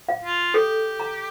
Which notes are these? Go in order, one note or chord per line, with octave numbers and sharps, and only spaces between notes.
F5
F4
G4 A4
A#5